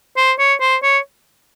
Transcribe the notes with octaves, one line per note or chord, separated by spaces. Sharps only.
C5
C#5
C5
C#5